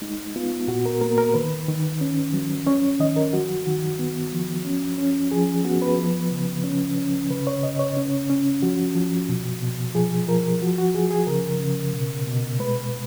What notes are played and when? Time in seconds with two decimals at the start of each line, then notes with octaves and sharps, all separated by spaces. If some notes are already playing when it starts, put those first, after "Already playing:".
0.02 G#3 D#4
0.36 B3 F4
0.68 A#2 F#4
0.86 A#4
1.01 A#3 A#4
1.18 A#4
1.34 D#3 B4
1.68 D#3
2.01 C#4
2.33 F#3
2.66 C#4 C#5
2.99 D#3 D#5
3.16 A#4
3.33 F#3 F#4
3.66 D#3 F#4
3.99 B3
4.33 F3
4.65 C#4
4.98 C#4
5.31 F3 G#4
5.65 B3 F#4
5.82 B4
5.98 F3
6.32 C#3
6.64 C#4
6.97 C#4
7.30 C#3 B4
7.47 C#5
7.63 C#3 D#5
7.79 C#5
7.97 C#4
8.30 C#4
8.63 F3 F#4
8.95 F3
9.29 B2
9.62 B2
9.95 F3 G#4
10.28 F3 A#4
10.61 F3 F#4
10.78 F#4
10.94 F3 G#4
11.11 G#4
11.27 C#3 A#4
11.60 C#3
11.93 B2
12.27 B2
12.59 G#3 B4